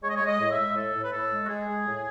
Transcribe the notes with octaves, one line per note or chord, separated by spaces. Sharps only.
G#3 C#5
D#5
G#3 C#5
D#5
A2
E5
G#3
A2 A4
A2
B4
A2 A4
G#3
F#4
G#3 G#4
G#3
A2